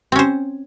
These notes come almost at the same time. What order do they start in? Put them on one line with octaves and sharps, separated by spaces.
C4 C#4 C5